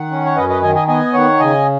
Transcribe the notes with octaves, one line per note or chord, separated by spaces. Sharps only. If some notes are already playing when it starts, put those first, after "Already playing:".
Already playing: D#3 F#5
C#4
C#5
F#2 B4 D#5
B4 D#5
D#3 D#5 G#5
D#5 G#5
B3 D#5 G#5
D#3 C#5 F#5
C#3 D#5 G#5